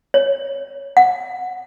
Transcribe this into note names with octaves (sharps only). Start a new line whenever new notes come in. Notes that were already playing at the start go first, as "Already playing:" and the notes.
C#5
F#5